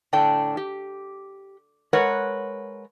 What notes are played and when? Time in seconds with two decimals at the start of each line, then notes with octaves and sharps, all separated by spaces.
0.13 A2 D3 D4 A4 G5
0.57 G4
1.93 G#3 A#4 B4 C#5 F#5